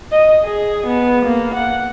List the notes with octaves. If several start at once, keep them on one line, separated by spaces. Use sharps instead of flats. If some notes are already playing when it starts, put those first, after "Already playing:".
D#5
G#4
B3
A#3
F#5